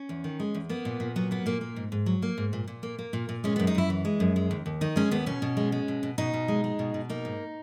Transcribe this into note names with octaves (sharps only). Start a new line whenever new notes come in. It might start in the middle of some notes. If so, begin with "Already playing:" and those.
Already playing: C#4
E2
D#3
G#3
E2
A#3 B3
A#2
A#2
F#3 B3
A#3 B3
A#2 A#3
A#3
G#2
G#2
F#3
A#3
G#2
A#2
A#2
A#3
A#3
A#2
A#2
G#3 C#4
F#2 B3
D#4
F#2 E4
E3
G#3
F#2
G#3
D#2
D#2
D#3 D#4
G#3 C#4
D#2 B3
B2 C#4
B2
G#3
G#3
B2
B2
B2 D#4
B2
G#3
G#3
B2
B2
A#3 D#4
G#2